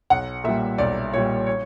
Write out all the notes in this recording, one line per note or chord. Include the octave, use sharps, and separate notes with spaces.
B1 F#5
A#2 G3 E5
B1 D5
A#2 G3 C#5
C#5